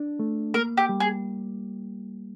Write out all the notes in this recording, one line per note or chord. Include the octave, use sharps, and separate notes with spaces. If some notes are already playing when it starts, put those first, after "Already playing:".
Already playing: D4
A3
A#3 A#4
G4
G3
G#4